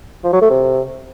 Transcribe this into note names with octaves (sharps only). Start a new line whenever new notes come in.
F3
F#3
A3
C3